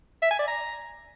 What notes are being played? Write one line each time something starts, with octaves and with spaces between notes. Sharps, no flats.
E5
G#5
D5
A#5